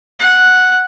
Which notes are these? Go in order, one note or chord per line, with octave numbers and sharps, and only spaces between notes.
F#5